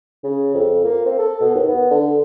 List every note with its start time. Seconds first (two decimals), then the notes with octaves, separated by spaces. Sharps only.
0.24 C#3
0.55 F2
0.84 A#3
1.06 C4
1.19 A4
1.41 B2
1.55 D#2
1.68 B3
1.91 D3